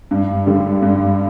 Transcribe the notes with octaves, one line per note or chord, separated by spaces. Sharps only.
G2
D3 G3
G2